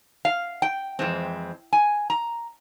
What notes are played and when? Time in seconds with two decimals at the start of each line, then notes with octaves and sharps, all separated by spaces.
0.25 F5
0.62 G5
0.99 F2 E3 G#3 C4
1.73 G#5
2.10 A#5